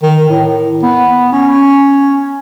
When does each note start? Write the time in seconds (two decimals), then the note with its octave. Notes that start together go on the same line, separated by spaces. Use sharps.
0.02 D#3
0.29 A2
0.83 B3
1.32 C#4